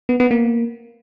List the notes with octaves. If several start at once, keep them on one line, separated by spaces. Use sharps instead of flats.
B3
B3
A#3